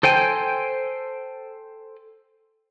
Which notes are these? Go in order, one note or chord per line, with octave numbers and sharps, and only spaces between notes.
A4 C5 G5 G#5